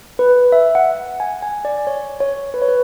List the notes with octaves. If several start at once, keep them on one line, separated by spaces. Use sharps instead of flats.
B4
E5
F#5
G#5
G#5
D5
C#5
C#5
B4
C#5
B4